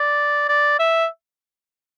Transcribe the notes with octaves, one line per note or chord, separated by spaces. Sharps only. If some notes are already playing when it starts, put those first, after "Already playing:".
Already playing: D5
D5
E5